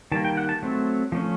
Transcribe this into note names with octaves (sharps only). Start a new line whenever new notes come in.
D#3 G3 A#3 A5
G5
F#5
A5
F#3 A3 C4
F3 A3 C#4